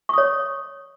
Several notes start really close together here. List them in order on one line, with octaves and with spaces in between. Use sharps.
C#6 D#6 C#5